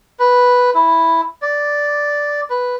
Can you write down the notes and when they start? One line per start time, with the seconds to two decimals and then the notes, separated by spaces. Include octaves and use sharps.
0.19 B4
0.75 E4
1.42 D5
2.50 B4